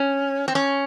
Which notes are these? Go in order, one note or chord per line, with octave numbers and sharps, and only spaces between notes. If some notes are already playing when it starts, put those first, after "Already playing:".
Already playing: C#4
C4
C#4